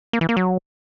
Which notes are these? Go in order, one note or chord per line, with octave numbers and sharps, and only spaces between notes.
A#3
E3
A#3
F#3